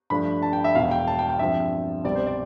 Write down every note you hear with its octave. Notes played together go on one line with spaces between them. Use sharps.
G2 F3 A3 D4 B5
A5
G5
E5
E1 E2 B2 F5
G5
A5
G5
G5
G2 F3 C4 E5
C2 B2 G3 C4 D5
C5
D5